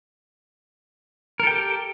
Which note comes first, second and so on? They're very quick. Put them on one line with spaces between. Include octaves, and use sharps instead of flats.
A#4 A4 G5 G4